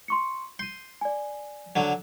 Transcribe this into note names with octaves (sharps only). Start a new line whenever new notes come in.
C6 C#6 C#7
C6 G6 D#7
D5 G#5
D3 F#3